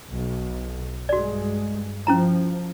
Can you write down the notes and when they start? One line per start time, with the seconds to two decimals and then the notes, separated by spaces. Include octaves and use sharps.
0.12 B1
1.09 G2 G#3 F#4 D5
2.07 F3 C#4 E4 A#5